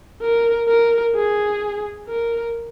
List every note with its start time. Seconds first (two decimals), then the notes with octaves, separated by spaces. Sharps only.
0.22 A#4
0.68 A#4
1.16 G#4
2.08 A#4